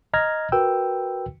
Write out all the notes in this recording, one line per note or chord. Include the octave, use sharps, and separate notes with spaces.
D#5 A#5 F6 G#6 A#6
F#4 A#4 B4 G5 E6